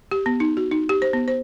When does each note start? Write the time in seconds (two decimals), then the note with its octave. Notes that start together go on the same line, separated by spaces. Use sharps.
0.11 G4
0.26 B3
0.40 D#4
0.57 F#4
0.71 D#4
0.89 G4
1.02 C5
1.13 B3
1.28 C5